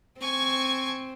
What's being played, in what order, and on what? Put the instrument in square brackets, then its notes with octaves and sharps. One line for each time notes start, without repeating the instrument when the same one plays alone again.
[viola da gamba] C4 [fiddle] G#5 C#6